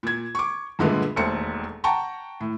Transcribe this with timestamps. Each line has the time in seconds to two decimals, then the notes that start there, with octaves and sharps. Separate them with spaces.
0.03 A#2 G#6
0.35 C#6 D6
0.79 G2 A#2 D3 G#3 A3 B3
1.16 E1 D#2 A3 C5 C#7
1.84 F#5 G5 A5 A#5 C#6
2.41 A2